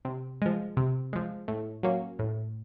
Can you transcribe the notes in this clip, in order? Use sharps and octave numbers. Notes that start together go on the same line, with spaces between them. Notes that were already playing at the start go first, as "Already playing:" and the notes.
C3
F3 G#3
C3
F3 G#3
A2
F#3 A#3 C#4
A2